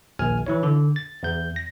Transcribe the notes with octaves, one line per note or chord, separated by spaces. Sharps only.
A#1 D#2 G#5 F6
E3 E4 C#5
D3
A6
E2 G6
A#6